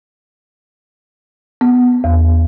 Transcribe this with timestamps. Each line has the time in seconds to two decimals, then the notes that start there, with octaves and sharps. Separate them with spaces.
1.61 B3
2.04 E2